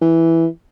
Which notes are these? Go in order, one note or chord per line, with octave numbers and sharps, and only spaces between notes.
E3